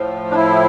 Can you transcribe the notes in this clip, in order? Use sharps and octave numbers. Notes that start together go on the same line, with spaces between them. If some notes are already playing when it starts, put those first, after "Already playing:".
Already playing: A2 F3
D4
E4